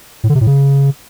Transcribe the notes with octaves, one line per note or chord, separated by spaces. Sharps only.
A2
D3
C3
A2
C#3